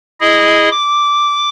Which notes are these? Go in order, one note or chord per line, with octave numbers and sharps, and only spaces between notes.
E4 G#4 D#5
D6